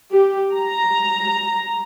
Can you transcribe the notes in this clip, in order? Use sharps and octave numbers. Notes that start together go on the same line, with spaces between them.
G4
A#5